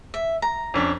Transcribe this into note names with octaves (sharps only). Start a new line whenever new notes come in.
E5
A#5
F2 C#4 D4